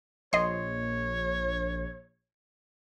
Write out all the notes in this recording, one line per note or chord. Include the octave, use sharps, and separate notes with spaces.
A#1 C#5 D#5 C6